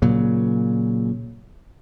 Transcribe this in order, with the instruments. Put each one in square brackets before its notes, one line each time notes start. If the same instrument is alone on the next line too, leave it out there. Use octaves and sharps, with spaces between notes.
[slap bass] A#2 C#3 F#3